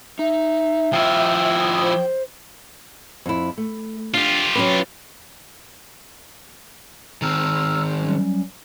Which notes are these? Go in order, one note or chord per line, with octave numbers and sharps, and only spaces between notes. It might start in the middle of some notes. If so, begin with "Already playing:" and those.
D#4 E5
F3 E4 G5
C5
F2 E4
A3
D4 F4 G4
F#3 C#4 B4
D#3 C4 A#5 E6 F6
F#3 G3 C#4